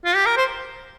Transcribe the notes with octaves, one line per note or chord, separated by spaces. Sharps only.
F4
G4
A#4
C5